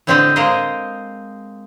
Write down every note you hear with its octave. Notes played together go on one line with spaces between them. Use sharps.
A2 D3 C4 G4 D5 D#5
G#3 A#3 A#4 C5 D#5